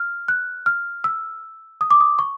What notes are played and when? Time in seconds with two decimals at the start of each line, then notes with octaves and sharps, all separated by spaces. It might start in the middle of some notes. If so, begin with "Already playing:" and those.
Already playing: F6
0.28 F#6
0.66 F6
1.04 E6
1.81 D#6
1.91 D6
2.00 D#6
2.19 C#6